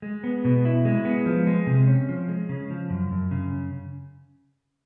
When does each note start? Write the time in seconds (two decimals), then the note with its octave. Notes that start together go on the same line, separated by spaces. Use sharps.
0.02 G#3
0.24 B3
0.45 B2
0.65 E4
0.85 G#3
1.05 B3
1.26 F3
1.47 G#3
1.67 C3
1.88 C#4
2.09 F3
2.29 G#3
2.49 C#3
2.70 F3
2.90 F#2
3.11 F#2
3.31 C#3